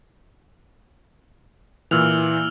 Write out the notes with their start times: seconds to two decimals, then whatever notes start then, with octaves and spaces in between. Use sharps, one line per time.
1.91 A#2 E3 E6 F6 F7